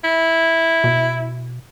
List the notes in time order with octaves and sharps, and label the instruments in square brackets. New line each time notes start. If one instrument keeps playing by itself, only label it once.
[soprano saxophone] E4
[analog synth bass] B2